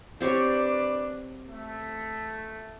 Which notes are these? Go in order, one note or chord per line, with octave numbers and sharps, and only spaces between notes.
C4 D4 G4 B4 C#5 D5
A3